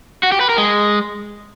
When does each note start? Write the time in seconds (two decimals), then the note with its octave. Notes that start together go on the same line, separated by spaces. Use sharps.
0.23 F#4
0.32 G4
0.41 B4
0.49 A#4
0.58 G#3